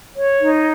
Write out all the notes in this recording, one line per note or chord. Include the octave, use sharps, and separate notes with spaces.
C#5
D#4